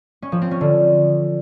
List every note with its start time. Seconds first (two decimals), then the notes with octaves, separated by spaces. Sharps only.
0.22 C#4
0.32 F3
0.42 C4
0.51 C#4
0.61 D3